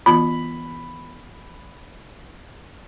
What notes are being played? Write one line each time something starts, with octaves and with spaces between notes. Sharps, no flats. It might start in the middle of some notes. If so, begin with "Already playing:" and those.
E3 B3 F4 B5